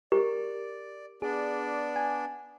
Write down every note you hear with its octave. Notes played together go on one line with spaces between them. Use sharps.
G4 A#4 D5
B3 D4 G#4 D5
G#5